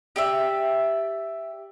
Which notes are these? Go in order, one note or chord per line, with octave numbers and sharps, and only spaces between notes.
G4 D5 E5